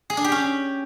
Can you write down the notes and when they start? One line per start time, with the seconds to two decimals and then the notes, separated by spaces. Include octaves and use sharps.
0.10 G#4
0.17 D4
0.24 G4
0.32 C#4